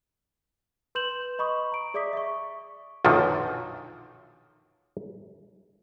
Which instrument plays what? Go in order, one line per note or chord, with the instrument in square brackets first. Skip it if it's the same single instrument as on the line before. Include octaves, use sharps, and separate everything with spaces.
[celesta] B4 C6 G6 E7 F#7
D#5 B5 C#6 D#6
A#5 D7
G#4 D5 E5 D6 D#6 B6
E5 C#6
[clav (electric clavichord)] B1 F#2 A#2 D3 D#3 F3